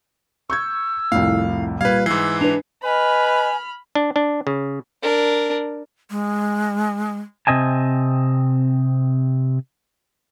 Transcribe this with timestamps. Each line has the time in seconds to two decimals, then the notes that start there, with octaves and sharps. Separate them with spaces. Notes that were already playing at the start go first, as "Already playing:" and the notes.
0.50 C#6 E6 G6 G#6
1.12 C2 F2 A2 F5
1.81 A#2 G3 B4 F5 G#6
2.06 G#2 E3 E6 C7
2.41 D4 B4 F7
2.84 B4 D#5 G#5 B5 F6
3.95 D4
4.16 D4
4.47 C#3
5.02 D4 A#4
6.10 G#3
7.47 C3 C4 D#5 G#5 A5